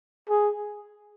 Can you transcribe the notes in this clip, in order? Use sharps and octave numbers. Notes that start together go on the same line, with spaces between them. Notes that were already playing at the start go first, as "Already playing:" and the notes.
G#4